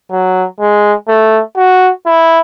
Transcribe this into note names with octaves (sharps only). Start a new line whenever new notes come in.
F#3
G#3
A3
F#4
E4